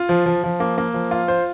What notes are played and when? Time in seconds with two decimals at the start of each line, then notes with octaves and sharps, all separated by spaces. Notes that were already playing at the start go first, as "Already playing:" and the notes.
Already playing: F4
0.09 F3
0.26 F3
0.43 F3
0.60 A#3
0.78 A#3
0.94 F3
1.11 F4
1.28 C5